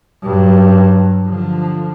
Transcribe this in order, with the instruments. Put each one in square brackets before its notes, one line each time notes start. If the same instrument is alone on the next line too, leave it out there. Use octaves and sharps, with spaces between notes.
[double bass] G2 F#3
D3 F3